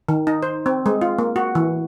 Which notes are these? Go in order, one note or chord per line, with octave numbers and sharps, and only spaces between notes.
D#3
D#4
C5
C4
G#3
F4
A#3
F#4
E3